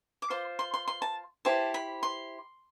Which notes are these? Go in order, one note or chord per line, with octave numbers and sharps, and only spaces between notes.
D6
F4 C5 C6
C6
C6
C6
A5
E4 G4 C5 A5
B5
C6